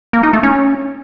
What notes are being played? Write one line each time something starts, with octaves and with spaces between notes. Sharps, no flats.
A#3
D#4
A3
C#4